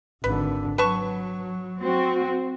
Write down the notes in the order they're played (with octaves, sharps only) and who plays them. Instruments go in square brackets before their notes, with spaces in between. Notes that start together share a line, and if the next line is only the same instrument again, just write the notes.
[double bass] G#1 D3 [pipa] B4
[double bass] F#3 [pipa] B4 A5 C#6
[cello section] C4 F#4